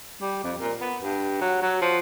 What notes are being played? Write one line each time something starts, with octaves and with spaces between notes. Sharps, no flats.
G3
F2
A#2
B3
G2
F#3
F#3
F3